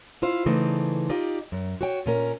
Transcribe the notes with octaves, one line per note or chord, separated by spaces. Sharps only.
E4 F4 C5 F5
C#3 E3 A3 D#4 C5 D5
D#4 F4 G4 D5
F#2
F#4 C#5 G5
A#2 C#4 A#4